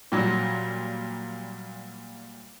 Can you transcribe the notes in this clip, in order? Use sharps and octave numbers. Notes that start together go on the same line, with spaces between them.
A#2 F#3 G3